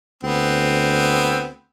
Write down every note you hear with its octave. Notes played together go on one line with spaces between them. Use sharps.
D2 B3 C4